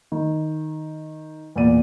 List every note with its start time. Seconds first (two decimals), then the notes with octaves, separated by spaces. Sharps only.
0.12 D#3
1.56 E2 A#2 D5 D#7